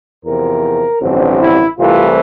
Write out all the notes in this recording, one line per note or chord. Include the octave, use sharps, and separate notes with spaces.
E2 C3 F3 A#4
A1 G2 D3 F3 C4
E4
C2 C3 E3 A3 F4